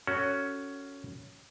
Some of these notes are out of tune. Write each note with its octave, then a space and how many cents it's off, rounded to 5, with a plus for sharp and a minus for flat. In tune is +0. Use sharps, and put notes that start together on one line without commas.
C#4 +10 F#4 +0 A4 +20